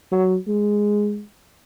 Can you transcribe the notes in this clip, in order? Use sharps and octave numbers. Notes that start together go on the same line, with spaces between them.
F#3
G#3